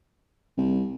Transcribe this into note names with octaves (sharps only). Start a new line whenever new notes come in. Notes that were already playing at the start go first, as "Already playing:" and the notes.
C2